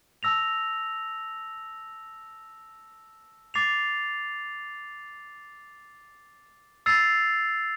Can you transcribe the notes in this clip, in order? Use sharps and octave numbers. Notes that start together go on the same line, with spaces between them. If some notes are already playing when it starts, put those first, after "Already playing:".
A5 E6 A#6 F7
D6 A6 C7 F7
E6 A6 C7 F7